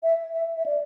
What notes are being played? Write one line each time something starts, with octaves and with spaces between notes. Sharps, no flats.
E5
E5
E5
D5